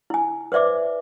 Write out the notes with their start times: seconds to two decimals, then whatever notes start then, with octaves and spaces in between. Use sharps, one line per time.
0.10 E4 G#5
0.52 B4 C5 D5 E5 D6